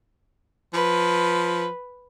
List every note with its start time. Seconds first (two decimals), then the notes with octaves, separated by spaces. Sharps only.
0.74 F3 B4